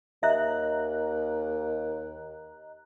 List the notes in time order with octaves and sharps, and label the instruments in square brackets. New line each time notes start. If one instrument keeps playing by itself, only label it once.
[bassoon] D#2 [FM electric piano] D#5 A#5 F#6 [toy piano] E5